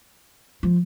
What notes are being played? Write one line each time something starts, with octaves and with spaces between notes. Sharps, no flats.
F3